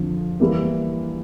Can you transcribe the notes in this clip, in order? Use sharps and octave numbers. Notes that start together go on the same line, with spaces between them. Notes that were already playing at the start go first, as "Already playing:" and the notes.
Already playing: F2 D3 F3
E3 G3 A#3 E4